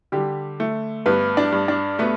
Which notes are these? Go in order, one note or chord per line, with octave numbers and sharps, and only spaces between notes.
D3 G3 G4
A3
G2 B3 B4
D4 D5
G2
D4 D5
A3 B3 B4